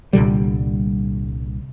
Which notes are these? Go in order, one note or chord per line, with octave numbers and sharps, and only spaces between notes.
C2 A#2 D3 G3